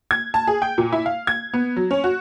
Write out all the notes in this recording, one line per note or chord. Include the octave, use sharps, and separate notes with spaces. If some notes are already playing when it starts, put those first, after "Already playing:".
G#6
A5
G#4
G5
A#2
E4
F5
G#6
B3
F#3
C#4
F#4